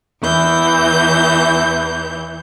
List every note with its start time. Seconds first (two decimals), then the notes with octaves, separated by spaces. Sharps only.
0.20 E2 E3 G6